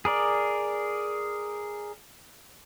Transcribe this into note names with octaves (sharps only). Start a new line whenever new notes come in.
G#4 A#4 D5